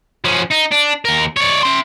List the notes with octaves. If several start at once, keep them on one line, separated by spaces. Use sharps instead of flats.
F3 C#4
D#4
D4
D#2 A#4
C#5 D5
E5 C6